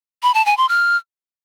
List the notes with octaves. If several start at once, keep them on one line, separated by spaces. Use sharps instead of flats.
B5
A5
G#5
C6
F6